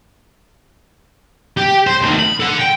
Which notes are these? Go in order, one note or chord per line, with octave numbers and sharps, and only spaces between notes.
G4
C5
D2 D#3
B5
A4 F#5
G5